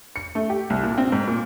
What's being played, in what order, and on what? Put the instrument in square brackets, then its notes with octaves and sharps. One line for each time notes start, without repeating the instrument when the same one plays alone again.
[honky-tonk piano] C#7
A3
G4
C2
A#2
C4
G#2
A#2